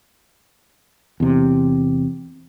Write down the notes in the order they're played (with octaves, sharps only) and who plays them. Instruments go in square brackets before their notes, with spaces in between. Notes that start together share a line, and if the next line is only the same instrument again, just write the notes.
[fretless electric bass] E2 C3